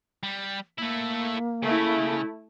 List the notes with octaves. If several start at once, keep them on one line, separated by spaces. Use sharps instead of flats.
G3
A3 A#3 E4
C#3 A3 E4